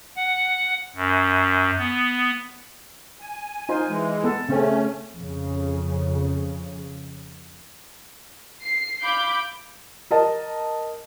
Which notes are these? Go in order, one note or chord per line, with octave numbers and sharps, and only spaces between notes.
F#5
F#2
B3
G#5
D#4 F4 C5
E3 G#3
B3 A4
C#3 A3 C4 C#4
F2 C#3
C7
F5 B5 D6 G6
A#4 D#5 A5